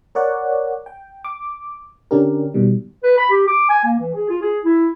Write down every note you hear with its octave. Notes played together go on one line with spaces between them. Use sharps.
A#4 C#5 D5 F#5
G5
D6
D3 C#4 D4 G4 A#4
B2 D#3 G3
B4
B5
G4
D6
G#5
A#3
E3
G#4
F4
G#4
E4